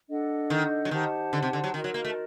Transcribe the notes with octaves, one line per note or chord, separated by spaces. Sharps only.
D4 A4 D#5 F#5
D#3
F#3
D#3 G4 C5 F#5 A5
D3
C3
D3
F#3
D#3 F#4 A#4 D#5
F#3
A#3
A3